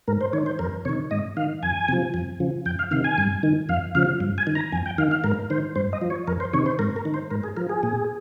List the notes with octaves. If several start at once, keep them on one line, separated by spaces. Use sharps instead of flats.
G#2 A#4
C5
D#3 C#5
C5
F2 A#4
C3 D#3 C#5
G#2 D#5
D#3 F5
F2 G#5
C3 F3
F2
C#3 F3
F2 G5
F5
C3 D#3 F5
G#5
G2
D#3
F2 F5
C#3 F3 F5
G2
G#5
D#3
A#5
F2 G#5
G5
D#3 F5
F5
G#2 A#4
D#3 C5
G2 C5
D#5
F3
C#5
F2 A#4
C5
C3 D#3 C#5
C5
G#2 A#4
A#4
D#3
C5
G#2 A#4
G#4
F3 A#4
G#4
A#2